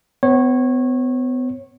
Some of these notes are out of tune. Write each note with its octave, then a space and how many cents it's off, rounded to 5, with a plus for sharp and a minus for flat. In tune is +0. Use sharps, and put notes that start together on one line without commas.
B3 +35 C#5 -20